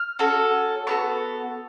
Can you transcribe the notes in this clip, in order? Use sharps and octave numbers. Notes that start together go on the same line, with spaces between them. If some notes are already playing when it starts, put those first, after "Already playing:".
Already playing: F6
C#4 F#4 A4
B3 D4 F#4 A4 C#6